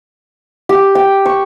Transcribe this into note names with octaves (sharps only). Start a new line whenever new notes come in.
G4
G5
C#6